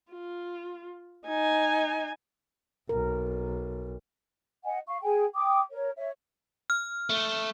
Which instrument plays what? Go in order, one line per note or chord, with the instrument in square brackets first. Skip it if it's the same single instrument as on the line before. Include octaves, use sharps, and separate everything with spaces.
[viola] F4
D#4 G#5
[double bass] B1 [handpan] A#4
[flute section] D#5 F#5 G#5
F5 C#6
G#4 G5 G#5
G5 D6 D#6
A#4 C#5
C#5 E5
[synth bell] F6
[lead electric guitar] A3